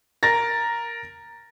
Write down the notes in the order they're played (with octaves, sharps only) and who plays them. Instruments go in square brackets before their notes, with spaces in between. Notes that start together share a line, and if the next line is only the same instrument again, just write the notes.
[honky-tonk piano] A#4 A6 A#6